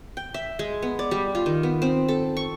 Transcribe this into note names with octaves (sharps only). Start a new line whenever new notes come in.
G5
E5
G#3
B3
D5
G3
F4
D#3
B3
C4
A4
C#6